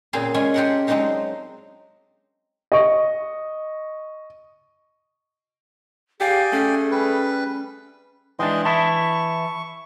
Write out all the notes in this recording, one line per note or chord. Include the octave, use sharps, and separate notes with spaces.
A#2 C#3 A#3 C4 G#4 F5
G#3 C#4 F4 E5 G#5
F4 G4 A4 A#4 D#5 F#5
F#3 G#3 C4 D4 D#4 F5
D#5 C#6
G4 G#4 D5 F5 G5 G#5
A3 C#4
G3 B4
E3 G#3 D4 D#5 G5 C6
E3 E4 A5 C#6